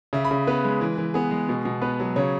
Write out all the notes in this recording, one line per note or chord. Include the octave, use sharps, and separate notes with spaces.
C#3 E5
B5
C#3
B3 B4
G#3
E3
E3
B3 G#4
G#3
B2
B2
B3 B4
F#3
C#3 C#5